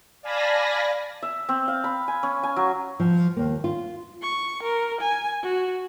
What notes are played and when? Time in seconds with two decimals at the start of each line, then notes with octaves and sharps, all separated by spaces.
0.22 D5 F5 G#5 A5 B5 A#6
1.23 E5
1.49 C4
1.68 F5
1.84 B5
2.08 G#5
2.23 C#4
2.43 G#5
2.56 F#3
3.00 F3
3.37 D#2 A#3
3.64 F4
4.22 C#6
4.63 A#4
5.01 G#5
5.43 F#4